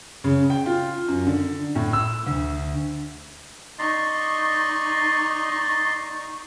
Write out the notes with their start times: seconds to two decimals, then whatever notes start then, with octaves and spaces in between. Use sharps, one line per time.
0.24 C#3
0.50 G5
0.66 F4
1.08 F#2
1.26 D3
1.75 A2
1.93 E6
2.27 D2
3.79 D#4 D5 D#5 C6 C#6